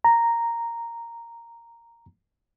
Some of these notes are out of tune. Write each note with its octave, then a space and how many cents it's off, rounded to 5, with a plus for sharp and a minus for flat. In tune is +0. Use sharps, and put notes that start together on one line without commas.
A#5 -5